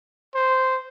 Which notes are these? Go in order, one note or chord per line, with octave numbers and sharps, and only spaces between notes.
C5